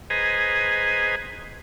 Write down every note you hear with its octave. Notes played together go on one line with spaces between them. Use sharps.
G#4 B4 C5 D#5 G#5 A#5